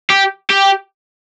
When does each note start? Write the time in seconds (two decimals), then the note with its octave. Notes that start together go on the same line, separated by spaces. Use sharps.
0.10 G4
0.50 G4